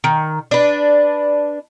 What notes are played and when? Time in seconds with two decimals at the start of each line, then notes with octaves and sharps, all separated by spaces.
0.04 D#3
0.51 D4 B4